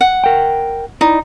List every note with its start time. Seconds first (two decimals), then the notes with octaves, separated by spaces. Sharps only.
0.01 F#5
0.24 A#4 G5
1.01 D#4 E4 D5